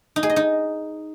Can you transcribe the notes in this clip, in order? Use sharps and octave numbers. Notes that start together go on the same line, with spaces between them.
D#4
G#4
D#5
D#4